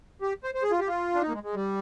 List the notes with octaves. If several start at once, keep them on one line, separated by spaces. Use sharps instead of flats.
G4
C5
C5
G#4
F4
G4
F4
D4
D#4
A#3
G#3
G#3
G3